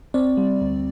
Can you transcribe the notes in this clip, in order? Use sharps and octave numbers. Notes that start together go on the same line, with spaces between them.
C4 D5
G3
D2